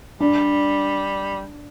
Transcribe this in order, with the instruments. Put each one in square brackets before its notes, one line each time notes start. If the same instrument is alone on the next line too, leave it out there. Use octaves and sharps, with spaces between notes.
[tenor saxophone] G3 [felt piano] D4